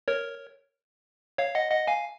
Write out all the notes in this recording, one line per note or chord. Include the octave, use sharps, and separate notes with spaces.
A#4 C#5
C#5 F5
D#5 F#5
D#5 F#5
F5 G#5